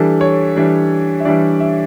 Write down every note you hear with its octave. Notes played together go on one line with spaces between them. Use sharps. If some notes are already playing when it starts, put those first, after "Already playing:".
Already playing: E3 G3 D4 A4
C#5
E3 G3 D4
E5
E3 G3 D4 D5
E5